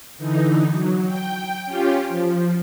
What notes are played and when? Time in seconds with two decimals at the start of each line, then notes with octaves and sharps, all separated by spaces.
0.18 D3 E3 D#4
0.67 F#3
1.06 G5
1.65 C#4 F4 G4
2.06 F3